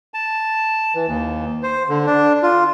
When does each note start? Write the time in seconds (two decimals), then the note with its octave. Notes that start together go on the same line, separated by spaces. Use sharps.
0.14 A5
0.95 E3
1.08 D#2
1.63 C5
1.89 D3
2.07 D4
2.43 F4